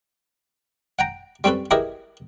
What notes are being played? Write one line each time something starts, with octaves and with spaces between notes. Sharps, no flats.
F#5 G5 A#5
G3 C4 C#4 A4 B4
E4 G4 G#4 A#4 B4 D#5